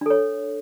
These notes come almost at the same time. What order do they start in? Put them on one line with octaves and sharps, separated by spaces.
D4 A4 C#5